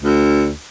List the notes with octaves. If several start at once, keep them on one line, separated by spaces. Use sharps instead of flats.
D2